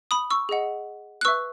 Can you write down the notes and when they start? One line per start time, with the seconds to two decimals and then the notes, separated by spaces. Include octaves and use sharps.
0.11 B5 D#6
0.30 C#6 E6
0.49 G#4 D#5 F#5
1.21 F#6
1.25 B4 E5 C#6 E6